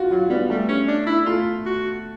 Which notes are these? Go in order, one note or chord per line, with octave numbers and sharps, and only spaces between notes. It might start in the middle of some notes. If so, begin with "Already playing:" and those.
Already playing: F4 F#4
F#3 F4
G3 B3
G3 A3
C#4
D4
E4
A3 F4
F#4